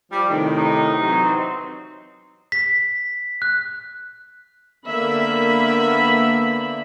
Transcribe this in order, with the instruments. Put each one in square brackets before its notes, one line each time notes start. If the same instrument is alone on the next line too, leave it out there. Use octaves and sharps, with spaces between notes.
[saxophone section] F3 G3
A2 C3 D#3
[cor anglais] D#4
[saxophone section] C3 E3 F#3
[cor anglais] C4
[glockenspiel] B6
F#6
[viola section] D3 A#3 B3 E5 B5